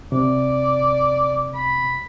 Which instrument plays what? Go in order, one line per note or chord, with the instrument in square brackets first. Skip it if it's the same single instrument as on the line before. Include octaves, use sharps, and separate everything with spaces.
[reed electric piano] C3 [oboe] D5
[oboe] B5